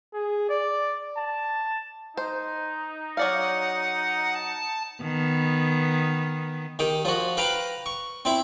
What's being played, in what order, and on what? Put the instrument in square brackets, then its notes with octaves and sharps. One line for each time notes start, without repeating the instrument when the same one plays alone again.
[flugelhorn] G#4
D5
A5
[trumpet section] D#4 [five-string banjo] C5
[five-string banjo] F#3 D5 F5 [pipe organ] F#5
[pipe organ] A5
[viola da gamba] D#3 B3
[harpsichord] D#3 G4
F3 F#4
B4 F5 G5 A#5 B5
C#6
C4 E4